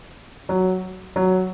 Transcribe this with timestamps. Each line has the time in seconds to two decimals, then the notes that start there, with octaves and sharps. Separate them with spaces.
0.49 F#3
1.16 F#3